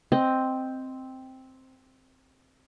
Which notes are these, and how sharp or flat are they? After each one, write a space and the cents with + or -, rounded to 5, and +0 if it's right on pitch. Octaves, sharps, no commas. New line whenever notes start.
C4 +0 D#5 +0